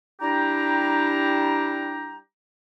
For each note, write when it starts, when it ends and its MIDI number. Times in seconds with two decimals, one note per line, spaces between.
0.21 2.18 55
0.21 2.18 62
0.21 2.18 64
0.21 2.18 67
0.21 2.18 82